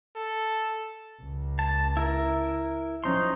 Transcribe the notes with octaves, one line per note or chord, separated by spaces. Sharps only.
A4
C#2
A5
E4 A#4
F3 C#4 D#4 C6